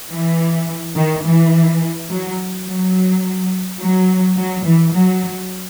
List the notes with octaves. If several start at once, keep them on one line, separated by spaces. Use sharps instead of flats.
E3
D#3
E3
F#3
F#3
F#3
F#3
E3
F#3